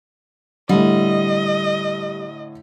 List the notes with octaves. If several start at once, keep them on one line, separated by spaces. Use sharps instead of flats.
A2 D3 G3 D#5